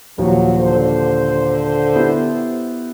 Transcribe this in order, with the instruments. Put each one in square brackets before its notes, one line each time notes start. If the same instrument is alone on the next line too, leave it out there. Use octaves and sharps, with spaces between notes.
[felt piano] D#2 A#2 F3 [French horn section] F#3
[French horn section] D3 C5
[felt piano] B3 E4 G4